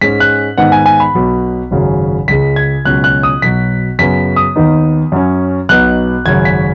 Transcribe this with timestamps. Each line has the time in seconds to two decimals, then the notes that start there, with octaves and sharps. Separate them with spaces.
0.01 G#2 G#3 C#4 B6
0.20 F#6
0.58 G#2 D#3 B3 D#4 F#5
0.72 G#5
0.86 G#5
1.00 B5
1.14 B1 B2 F#3
1.71 G#1 F#2 C#3 F#3
2.28 C#2 C#3 G#3 B6
2.56 G#6
2.85 C#2 B2 F#3 C#4 F#6
3.04 F#6
3.23 D#6
3.42 B1 B2 F#3 B6
3.99 F#2 C#3 B3 B6
4.36 D#6
4.56 D#2 D#3 B3 D#4
5.12 F#2 F#3 C#4
5.69 B1 B2 B3 D#4 F#6
6.26 G#1 F#2 C#3 G#6
6.45 B6